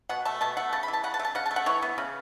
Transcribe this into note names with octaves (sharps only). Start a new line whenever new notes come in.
B2 F#5
A3 A5
B2 A5
A3 F#5
C#3 A5
B5
E3
A5
C#3 F#5
A5
A3
A5
C#3 F#5
A5
A3
F#5
E3 C#5
B3
C#3